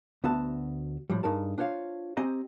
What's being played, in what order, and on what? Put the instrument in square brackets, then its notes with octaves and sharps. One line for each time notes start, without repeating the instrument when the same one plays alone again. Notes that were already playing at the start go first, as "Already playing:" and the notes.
[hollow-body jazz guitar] D2 B3 F#4 E5 A5
A2 F3 G3
G2 D#4 G#4 A#4 A5
D4 F4 C5 C#5 F5
C4 G4 D#5 G#5 A#5